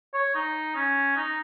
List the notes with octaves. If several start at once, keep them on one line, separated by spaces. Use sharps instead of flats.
C#5
D#4
C#4
D#4